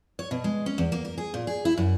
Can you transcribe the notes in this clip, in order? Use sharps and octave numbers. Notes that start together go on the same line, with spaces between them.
C#5
B2
G#3
C#4
E2
A#3
A#4
G#4
A#2
G#4
E4
F#2